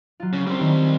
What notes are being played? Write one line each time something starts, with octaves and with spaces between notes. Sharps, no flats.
F#3 F4
C#3
G3 C4
D#3